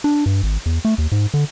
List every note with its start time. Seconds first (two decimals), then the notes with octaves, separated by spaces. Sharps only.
0.04 D4
0.26 G2
0.43 G#1
0.66 E2
0.85 A3
0.98 D#2
1.12 G#2
1.34 D3